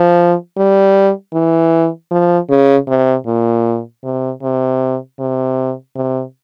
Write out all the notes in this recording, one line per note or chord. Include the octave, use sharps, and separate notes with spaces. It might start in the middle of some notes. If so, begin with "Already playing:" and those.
Already playing: F3
G3
E3
F3
C#3
C3
A#2
C3
C3
C3
C3